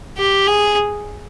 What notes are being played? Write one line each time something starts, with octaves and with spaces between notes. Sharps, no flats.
G4
G#4